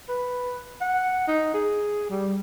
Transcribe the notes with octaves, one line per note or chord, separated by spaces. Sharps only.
B4
F#5
D#4
G#4
G3